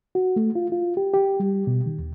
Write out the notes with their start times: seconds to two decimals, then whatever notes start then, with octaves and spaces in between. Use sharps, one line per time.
0.15 F#4
0.36 A3
0.55 F4
0.72 F4
0.97 G4
1.14 G4
1.40 G3
1.67 B2
1.86 D#3
1.99 D#2